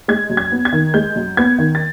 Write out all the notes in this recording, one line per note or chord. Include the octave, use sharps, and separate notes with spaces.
G#3 G#6
F#2
G#6
B3
G#6
D#3
G#3 G6
F#2
B3 G#6
D#3
A6